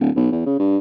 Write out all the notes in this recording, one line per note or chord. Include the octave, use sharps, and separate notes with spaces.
D1
B1
E2
C#3
G2